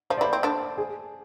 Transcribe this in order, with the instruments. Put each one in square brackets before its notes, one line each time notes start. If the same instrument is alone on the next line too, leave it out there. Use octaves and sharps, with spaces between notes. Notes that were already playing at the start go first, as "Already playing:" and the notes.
[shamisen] F3 F4 [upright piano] C5
[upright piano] D5
[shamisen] E3 E4 [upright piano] C5
[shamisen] C4
D3 D4
[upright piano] G#4